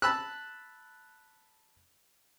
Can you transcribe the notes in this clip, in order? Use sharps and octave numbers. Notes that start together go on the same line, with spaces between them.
A5 B5 E6 F#6